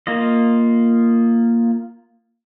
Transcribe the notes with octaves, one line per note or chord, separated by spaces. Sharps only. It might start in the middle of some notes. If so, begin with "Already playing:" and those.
A#3 F4 D#5